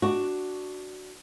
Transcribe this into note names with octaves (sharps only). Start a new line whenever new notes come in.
D4 F#4